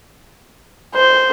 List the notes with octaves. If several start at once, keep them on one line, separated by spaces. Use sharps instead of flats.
C5